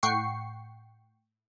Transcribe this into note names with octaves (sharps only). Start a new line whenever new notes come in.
A2 F#5 G5 C#6 C7 C#7